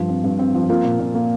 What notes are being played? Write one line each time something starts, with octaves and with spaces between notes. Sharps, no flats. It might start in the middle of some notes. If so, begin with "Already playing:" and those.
Already playing: G2 F3 F4
C4
G2
C4
F3
A#3 F4
A#2
A#2
A#3